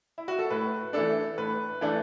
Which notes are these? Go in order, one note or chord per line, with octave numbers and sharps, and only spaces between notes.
E4
F#4
A4
A2 B4
E3 A3 D4 A4
A2 B4
E3 A3 D4